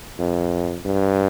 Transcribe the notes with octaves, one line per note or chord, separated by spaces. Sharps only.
F2
G2